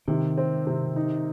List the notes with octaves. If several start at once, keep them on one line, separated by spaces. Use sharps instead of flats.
C3 D#3
C4
C3
D#4